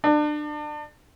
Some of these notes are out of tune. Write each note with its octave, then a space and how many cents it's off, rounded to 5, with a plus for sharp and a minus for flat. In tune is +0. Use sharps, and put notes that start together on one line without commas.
D4 +30